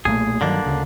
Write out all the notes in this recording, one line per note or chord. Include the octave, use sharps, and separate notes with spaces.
B1 A#2 A3 G#4
G2 D3 D#3 F#3 A#3 D4
D2 C#3